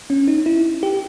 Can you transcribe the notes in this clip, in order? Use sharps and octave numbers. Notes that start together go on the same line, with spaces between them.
C#4
D#4
E4
G4